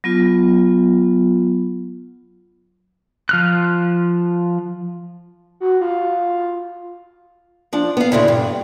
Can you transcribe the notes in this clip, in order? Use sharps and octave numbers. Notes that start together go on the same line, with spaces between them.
F#3 B3 F4
F3 F6 F#6
F#4
F4
F3 D4
B3 F5
D2 A#2 C#3 D4 E4
G2